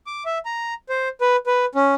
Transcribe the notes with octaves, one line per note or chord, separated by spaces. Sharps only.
D6
E5
A#5
C5
B4
B4
C#4